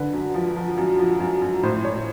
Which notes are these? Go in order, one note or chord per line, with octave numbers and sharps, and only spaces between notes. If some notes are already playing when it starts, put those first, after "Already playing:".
Already playing: D3 B4
F#2
F3
F3
F#2
F3
F#2
F#2
A2 C5
A2 C#5